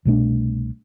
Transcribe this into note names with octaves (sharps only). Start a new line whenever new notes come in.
C2 B2 A3 D4